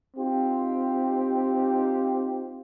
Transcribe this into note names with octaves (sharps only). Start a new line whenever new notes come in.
C4 D#4 F4 G4